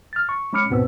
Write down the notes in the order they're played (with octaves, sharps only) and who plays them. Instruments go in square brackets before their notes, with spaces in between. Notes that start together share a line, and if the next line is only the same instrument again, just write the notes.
[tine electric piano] F6 A6
C#6
G#3 C#4 B5 D6 F6 C#7
D2 G#2 B2 B3 C4 E6